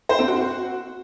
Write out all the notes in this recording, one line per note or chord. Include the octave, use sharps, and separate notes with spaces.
C5
C4
F#4